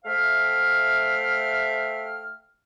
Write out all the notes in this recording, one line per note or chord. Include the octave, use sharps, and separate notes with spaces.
A3 C5 E5 F5 G5 F6